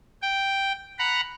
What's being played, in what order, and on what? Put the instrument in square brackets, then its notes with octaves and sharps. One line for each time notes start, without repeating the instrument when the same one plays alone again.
[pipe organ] G5
F#5 A#5 B5